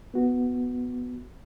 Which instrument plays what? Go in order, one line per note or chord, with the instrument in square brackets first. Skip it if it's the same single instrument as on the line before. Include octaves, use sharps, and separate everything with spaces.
[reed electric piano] B3 F#4